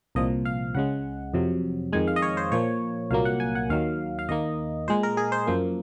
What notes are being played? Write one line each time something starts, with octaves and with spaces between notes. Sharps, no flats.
C2 A#2 F3 D#5
F5
C#2 C#3 G#3 F#5
F2 C3 F#3
F2 D#3 G#3 G#5
F5
D#5
C#5
C5
A#2 F3 A#3 C#5
C2 A#2 F#3 A#3 F5
F#5
G#5
F#5
D#2 D#3 F#3 F5
F5
D#2 D#3 A#3 D#5
A#2 G#3 C5
A#4
G#4
C5
F#2 F3 A#3